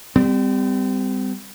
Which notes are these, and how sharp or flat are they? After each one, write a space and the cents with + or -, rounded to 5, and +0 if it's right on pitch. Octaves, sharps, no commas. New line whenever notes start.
G3 +15 C4 -35